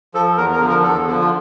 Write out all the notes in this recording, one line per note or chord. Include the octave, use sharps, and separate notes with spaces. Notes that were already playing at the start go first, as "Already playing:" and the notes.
F3 A4
E2 A#4
A#4
D3 F3
A#4
E2 A4
D3 F3
F4